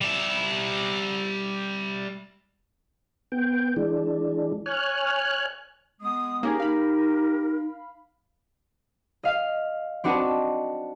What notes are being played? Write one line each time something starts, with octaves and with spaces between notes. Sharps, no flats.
G3 E5
B3 G5
E3 G#3 D4
C#5 G#5 F6 F#6
G#3 B3 D#6
A#3 C#4 D#4 G4 G#4 A#4
D#4 F5 B5
D#5 F5
C4 D4 F#4 B4 D#5 A5